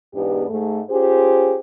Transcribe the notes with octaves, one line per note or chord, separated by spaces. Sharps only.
E2 G#2 B3 D4 G4
G#2 A3
C#4 F4 G4 G#4 C5